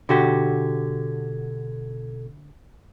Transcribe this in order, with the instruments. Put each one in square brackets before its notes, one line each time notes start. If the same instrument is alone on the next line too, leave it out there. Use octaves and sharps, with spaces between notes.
[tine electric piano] B2 A4 G#6 [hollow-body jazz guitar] D3 F#4 G4